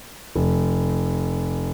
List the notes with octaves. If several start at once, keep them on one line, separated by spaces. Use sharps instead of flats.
F1